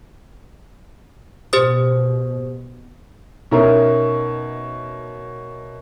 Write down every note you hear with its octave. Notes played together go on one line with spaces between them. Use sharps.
B2 G4 C5 D#6
B2 C#4 D#4 A#4 E5